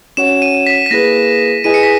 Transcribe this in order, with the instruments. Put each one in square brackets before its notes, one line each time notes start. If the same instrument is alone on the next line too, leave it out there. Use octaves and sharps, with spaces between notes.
[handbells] C#4 F#4 C#5 F#5 [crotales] E7
[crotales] D#7
B6
B6
[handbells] A#3 E4 G#4 B4 [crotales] A#6
[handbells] E4 G#4 B4 D#5 G#5 [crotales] D#7
[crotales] C#7
B6